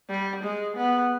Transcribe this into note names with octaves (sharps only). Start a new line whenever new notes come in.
G3
G#3
B3